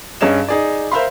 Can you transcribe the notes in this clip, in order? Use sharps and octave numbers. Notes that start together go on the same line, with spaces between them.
G2 C#4 G#4 D#5 E7
D#4 G#4 D5
A#4 C5 E5 F5 B5 C6